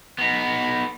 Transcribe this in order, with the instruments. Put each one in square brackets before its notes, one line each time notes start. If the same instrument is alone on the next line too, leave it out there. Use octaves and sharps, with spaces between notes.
[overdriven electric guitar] B3 D#4